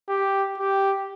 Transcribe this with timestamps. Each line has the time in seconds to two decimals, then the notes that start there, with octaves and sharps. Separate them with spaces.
0.08 G4
0.58 G4